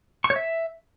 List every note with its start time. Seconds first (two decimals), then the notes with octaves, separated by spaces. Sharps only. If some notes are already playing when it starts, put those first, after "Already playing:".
0.24 C#6
0.30 C#5
0.36 E5